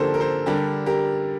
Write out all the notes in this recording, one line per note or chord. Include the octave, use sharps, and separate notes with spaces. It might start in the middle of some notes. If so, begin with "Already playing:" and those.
Already playing: D3 F3 A#3 D4 G4 A4 A#4 C5
A#4
A4 C5
D3 G3 D4 G4 A#4
G4 A#4